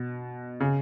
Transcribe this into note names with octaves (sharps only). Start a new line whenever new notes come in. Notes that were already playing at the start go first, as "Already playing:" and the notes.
Already playing: B2
C#3